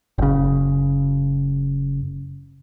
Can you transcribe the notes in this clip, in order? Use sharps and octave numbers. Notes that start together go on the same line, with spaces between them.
F#1 C#3